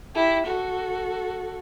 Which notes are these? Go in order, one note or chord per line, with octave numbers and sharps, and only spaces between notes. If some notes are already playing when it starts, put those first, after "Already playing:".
E4 G4
F#4 A4